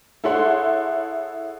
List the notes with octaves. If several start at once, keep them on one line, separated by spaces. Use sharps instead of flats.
E4 G#4 A4 C#5 F#5 C6